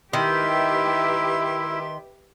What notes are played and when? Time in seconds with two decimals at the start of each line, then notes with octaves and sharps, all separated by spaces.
0.13 D#3 E4 G4 B4 E5 C6